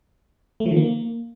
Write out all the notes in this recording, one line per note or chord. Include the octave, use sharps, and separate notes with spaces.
A3
F3
D#3
A#3